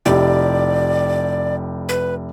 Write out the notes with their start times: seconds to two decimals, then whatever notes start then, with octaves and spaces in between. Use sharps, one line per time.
0.06 F1 E4 G4 D5
1.89 B4